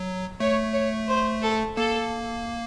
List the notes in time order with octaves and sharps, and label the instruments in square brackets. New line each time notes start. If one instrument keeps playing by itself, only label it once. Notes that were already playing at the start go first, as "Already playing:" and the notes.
Already playing: [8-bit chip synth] F#3
[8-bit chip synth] A3 [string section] C#5
[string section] C#5
C5
A4
[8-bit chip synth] A#3 [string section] A4